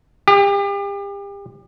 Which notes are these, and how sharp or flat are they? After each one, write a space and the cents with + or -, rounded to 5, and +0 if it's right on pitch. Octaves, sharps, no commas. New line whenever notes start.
G4 +35